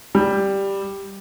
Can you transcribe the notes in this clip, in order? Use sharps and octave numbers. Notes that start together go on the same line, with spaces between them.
G3